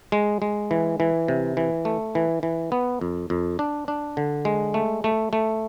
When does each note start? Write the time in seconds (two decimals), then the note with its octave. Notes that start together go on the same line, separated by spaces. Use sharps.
0.12 G#3
0.42 G#3
0.71 E3
1.00 E3
1.28 C3
1.57 E3
1.85 A3
2.15 E3
2.43 E3
2.72 B3
3.01 F2
3.30 F2
3.59 D4
3.88 D4
4.17 D3
4.45 G#3
4.74 A3
5.04 A3
5.33 A3